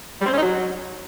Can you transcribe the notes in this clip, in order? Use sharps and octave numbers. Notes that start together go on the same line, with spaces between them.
G3
C4
C#4
D#4
F#3